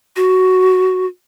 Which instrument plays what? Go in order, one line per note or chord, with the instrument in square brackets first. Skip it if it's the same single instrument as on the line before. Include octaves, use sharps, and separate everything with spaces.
[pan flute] F#4